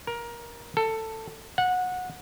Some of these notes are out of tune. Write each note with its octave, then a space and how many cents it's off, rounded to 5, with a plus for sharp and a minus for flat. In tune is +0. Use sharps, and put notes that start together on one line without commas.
A#4 +20
A4 +15
F#5 -20